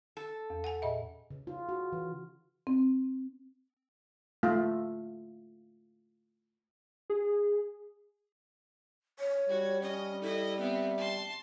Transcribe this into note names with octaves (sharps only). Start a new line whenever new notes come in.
A4
E2
F#5 G#5
A#2 D#5 E5
C#3
F4
F#4
E3
C4
A3 F4
G#4
C#5
G3 F#4 G#6
C#4 D#5
E4 A4 D#5
B3 C4 E5
A5 C6